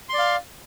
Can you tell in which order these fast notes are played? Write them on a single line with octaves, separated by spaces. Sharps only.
C6 D5 F5